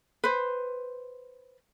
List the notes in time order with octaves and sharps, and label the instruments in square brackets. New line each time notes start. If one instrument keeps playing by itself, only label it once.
[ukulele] B4 C5